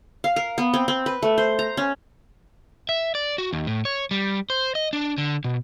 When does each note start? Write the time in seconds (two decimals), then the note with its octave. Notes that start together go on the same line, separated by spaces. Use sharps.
0.24 F5
0.36 A#4
0.58 B3
0.74 C4
0.88 C4
1.06 B4
1.22 A3
1.38 C5
1.59 A#5
1.77 C#4
2.89 E5
3.15 D5
3.38 F#4
3.53 D#2
3.67 A2
3.85 C#5
4.11 G3
4.50 C5
4.75 D#5
4.93 D4
5.18 D3
5.44 B2